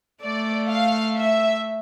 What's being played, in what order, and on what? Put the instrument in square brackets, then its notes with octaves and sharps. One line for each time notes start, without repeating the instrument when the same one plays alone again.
[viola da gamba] A3 [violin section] D5
[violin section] F5
E5